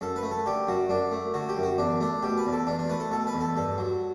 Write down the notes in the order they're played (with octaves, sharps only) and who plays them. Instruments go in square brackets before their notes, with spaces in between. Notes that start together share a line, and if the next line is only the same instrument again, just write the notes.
[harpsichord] F#2 A4
B4
A3
A4
D3 G4
F#2 F#4
F#2 D4
A3
D3 F#4
G4
F#2
F#4
E2 D4
A3 D4
B2 G4
B4
E2
A4
E2 D4
D4
A3 B4
A4
B2 A4
B4
E2
A4
G2 A4
F#3